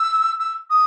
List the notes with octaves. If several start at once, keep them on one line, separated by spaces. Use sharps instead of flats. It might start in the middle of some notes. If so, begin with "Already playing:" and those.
Already playing: E6
E6
D#6